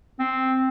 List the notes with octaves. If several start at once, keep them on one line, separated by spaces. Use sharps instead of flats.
C4